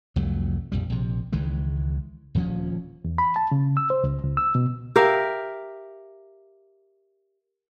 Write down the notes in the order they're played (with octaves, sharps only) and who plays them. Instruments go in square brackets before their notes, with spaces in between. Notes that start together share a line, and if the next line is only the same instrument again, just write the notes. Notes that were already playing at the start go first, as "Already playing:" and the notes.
[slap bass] C2 F2 F#3 A3
A#1 F2 G3
A#1 C3
C#2 D#3 E3 G#3
D#1 D2 F3 C#4
[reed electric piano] E2
B5
A5
C#3
E6
C5
C#2
C#2
E6
B2
[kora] G4 A#4 E5 F5